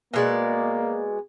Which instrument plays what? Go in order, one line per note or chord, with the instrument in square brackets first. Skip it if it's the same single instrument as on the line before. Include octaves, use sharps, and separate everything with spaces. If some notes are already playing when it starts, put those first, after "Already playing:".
[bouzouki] B2 G#3 D5 [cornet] A#3